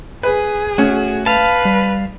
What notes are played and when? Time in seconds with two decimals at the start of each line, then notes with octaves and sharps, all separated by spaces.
0.23 G#4 B4
0.78 A3 C#4 F#4
1.26 B4 F5 A5
1.65 G3